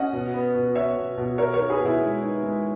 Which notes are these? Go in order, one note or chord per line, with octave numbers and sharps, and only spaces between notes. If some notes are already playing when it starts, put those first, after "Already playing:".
Already playing: C#4 D#5 F#5
B2
B3
B2
B3 C#5 E5
B2
B2
B3 A#4 C#5
A#4 C#5
D#4
G#4 B4
B2
E4 G#4
G#3
D#4
G#3